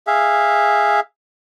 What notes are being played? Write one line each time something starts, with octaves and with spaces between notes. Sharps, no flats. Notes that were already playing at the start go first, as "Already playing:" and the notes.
G#4 E5 F5